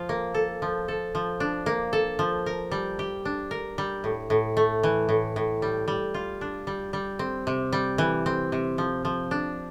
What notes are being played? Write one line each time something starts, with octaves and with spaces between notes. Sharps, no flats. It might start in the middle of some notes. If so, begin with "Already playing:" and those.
Already playing: F3 F4
A#3
A4
F3
A4
F3
D4
A#3
A4
F3
A#4
G3
G4
D4
A#4
G3
A2
A2
A3
E3
A2
A2
G3
G3
F4
D4
G3
G3
C4
C3
G3
E3
C4
C3
F3
F3
D4